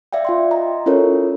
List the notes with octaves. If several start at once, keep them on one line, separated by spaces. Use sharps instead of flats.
D5 E5 F5 G5
F4 G5 C6
D#5 A#5
C#4 E4 F4 A4 A#4 C#5